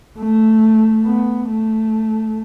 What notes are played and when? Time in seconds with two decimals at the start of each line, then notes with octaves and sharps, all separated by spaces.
0.20 A3
1.06 B3
1.50 A3